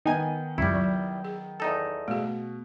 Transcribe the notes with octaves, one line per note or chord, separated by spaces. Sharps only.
D#3 B3 D#4 G#5
C#2 F#2 G3 E4 F4
F#3
G#4
E2 D#4 A4
B2 A3 G#4